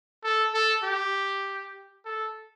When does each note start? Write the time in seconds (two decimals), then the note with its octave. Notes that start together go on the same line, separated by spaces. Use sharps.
0.23 A4
0.54 A4
0.84 G4
2.05 A4